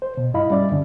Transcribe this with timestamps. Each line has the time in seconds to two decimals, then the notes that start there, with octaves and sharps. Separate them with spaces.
0.02 C5
0.17 B2
0.34 G2 E4 D#5 F5 B5
0.50 G3 C#4 D5 E5
0.70 G2 D3 C#4